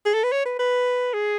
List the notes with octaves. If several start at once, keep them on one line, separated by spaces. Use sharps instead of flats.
G#4
A4
B4
C#5
B4
B4
G#4